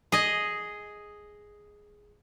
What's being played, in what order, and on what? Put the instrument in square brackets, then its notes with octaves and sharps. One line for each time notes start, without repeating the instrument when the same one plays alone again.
[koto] G#4 D#5